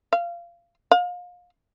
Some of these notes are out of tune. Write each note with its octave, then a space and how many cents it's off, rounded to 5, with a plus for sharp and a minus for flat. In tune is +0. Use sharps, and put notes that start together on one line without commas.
F5 -20
F5 +30